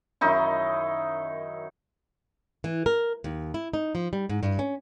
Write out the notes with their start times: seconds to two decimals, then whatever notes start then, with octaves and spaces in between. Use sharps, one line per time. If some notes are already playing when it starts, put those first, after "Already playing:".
0.21 F#2 D#3 D#4 E4
2.64 E3
2.86 A#4
3.24 D#2
3.54 E4
3.74 D#4
3.95 F3
4.13 G3
4.29 G#2
4.43 G2
4.59 C#4